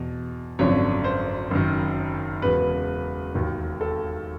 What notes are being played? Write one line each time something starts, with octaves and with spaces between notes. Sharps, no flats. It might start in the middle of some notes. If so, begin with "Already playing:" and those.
Already playing: E2 B2
G#1 F#2 D3 F3 C#5
C5
F#1 F#2 D#3
E1 E2 C#3 B4
E1 D#2 D#3
A4